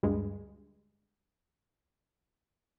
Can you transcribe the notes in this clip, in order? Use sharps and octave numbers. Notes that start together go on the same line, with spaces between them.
D2 G2 G#3